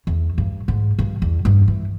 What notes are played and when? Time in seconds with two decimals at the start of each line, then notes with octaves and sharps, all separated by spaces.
0.07 E2
0.38 G2
0.68 G#2
0.99 G2
1.22 E2
1.45 G2
1.68 E3